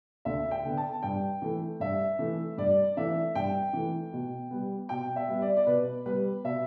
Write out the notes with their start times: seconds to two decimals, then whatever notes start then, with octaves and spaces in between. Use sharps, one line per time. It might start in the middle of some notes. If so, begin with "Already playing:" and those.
0.25 D2 E5
0.51 G5
0.64 D3 B3
0.77 A5
1.03 G2 G5
1.42 E3 A3
1.80 G2 E5
2.19 E3 A3
2.57 G2 D5
2.97 E3 A3 E5
3.35 G2 G5
3.73 E3 A3
4.13 B2
4.51 G3 B3
4.89 B2 G5
5.16 E5
5.28 G3 B3
5.42 D5
5.57 D5
5.66 B2 B4
6.06 G3 B3 B4
6.44 B2 E5